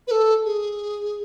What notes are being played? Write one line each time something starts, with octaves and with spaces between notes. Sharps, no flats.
B4
A4
G#4